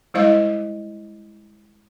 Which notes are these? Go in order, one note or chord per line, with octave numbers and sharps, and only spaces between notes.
G3 G#3 E4 C5 D#5 F5